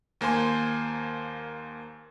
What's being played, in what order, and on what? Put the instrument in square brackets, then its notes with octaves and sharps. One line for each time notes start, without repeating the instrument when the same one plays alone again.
[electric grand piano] D#2 A#3 C5 G#5 C6